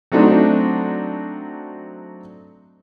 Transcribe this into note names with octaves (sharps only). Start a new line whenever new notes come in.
F#3 A3 C4 D4 D#4